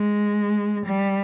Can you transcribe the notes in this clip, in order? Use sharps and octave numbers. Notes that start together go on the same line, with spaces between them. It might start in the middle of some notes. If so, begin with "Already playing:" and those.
Already playing: G#3
G3